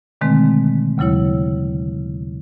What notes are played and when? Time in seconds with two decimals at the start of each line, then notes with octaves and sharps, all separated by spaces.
0.21 B2 D3 D#3 G#3 A3 C4
0.98 D#2 C#3 F#3 E4 C#5